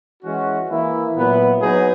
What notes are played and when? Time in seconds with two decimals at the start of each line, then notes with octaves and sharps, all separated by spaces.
0.24 E3 G#3 C#4 F#4
0.70 E3 A#3 E4
1.16 A#2 F#3 B3 E4 B4
1.62 F#3 B3 D#4 G#4 B4